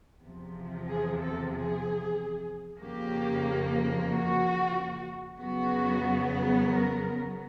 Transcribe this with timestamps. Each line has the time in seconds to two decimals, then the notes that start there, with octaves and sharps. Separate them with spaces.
0.23 E2 C3 F3
0.88 G#4
1.19 A4
1.52 G#4
2.81 F2 C#3 F3 A#3 G4
4.09 F#4
5.38 F2 C#3 F#3 B3 F#4
6.67 A#4